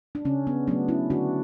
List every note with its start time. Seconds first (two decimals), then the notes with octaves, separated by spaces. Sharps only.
0.15 D4
0.25 C#3 C#4
0.47 B3 D4
0.67 F#3 A3 B3 D4
0.88 C#4 E4
1.10 D3 D4 F#4